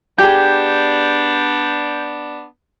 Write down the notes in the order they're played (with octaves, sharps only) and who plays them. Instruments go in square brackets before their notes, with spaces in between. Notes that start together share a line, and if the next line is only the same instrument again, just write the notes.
[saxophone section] B3 D4 [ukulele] G4 G#4 [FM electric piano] G6